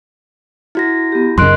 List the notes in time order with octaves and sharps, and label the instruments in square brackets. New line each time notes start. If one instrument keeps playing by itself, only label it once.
[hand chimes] E4 F#4 A#6
[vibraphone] B3 G4
[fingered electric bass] F#2 C#3 [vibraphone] A#4 D#5 [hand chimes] C6 F#6 D7